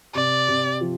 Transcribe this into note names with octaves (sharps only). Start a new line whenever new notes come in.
C3 D5
C3
F3